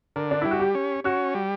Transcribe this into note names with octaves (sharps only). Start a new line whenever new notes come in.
D3 A#4
D4
G3 E4
F#4
G4
C#4
C#4 F#4
G3